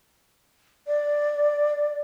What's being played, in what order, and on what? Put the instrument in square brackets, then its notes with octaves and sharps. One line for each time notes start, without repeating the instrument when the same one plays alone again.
[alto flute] D5